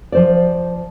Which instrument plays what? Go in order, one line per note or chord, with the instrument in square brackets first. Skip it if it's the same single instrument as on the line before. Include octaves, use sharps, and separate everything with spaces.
[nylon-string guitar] F3 C5 D5